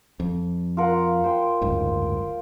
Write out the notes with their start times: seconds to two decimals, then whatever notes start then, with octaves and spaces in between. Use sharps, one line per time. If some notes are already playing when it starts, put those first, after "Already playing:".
0.20 F2
0.77 F4 A#4 F#5
1.24 C5 G5
1.61 F#1 D2 G#2